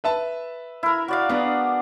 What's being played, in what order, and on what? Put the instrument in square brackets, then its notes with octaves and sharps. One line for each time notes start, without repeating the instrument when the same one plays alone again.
[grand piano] B4 E5 A5
[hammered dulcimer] E4 A#4
F#4 D5 F5
[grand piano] B3 [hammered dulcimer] D4 G#4 F#5